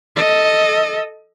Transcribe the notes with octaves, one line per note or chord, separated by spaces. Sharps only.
A4 D#5